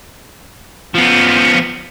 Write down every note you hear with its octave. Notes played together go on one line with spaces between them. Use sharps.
F3 B3